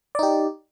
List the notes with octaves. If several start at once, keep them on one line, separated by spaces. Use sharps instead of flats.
D#4 G4 D5